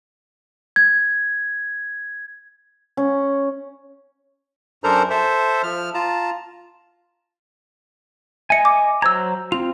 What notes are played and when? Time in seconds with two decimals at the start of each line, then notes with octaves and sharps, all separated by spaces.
0.76 G#6
2.97 C#4
4.84 F#2 D4 A4 A#4 C5 A#5
5.10 A4 C5 E5
5.63 F3 F6
5.94 F4 A5 A#5
8.50 D#5 E5 G#5 C#7
8.65 D6
9.02 F#3 C5 A#5 E6 G#6
9.52 C4 F4 F7